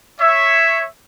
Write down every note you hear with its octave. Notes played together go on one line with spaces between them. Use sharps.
C#5 E5